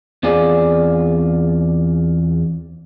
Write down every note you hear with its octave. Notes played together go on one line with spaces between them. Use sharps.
E2 C4 F4 G#4 D5